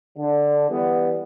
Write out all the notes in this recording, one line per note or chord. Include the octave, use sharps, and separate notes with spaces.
D3
E3 G3 B3